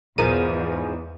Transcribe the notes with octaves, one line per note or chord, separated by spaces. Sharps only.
B1 E2 G#2 F3 G#4 A#4 D#7